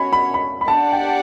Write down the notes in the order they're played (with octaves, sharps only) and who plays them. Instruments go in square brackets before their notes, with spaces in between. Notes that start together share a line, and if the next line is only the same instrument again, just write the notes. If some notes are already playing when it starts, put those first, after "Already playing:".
Already playing: [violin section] C#4 F#4 C#5 [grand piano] B5
[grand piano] B5
B5
B5
[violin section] D4 G4 D5 F#5 [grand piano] A5
[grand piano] G5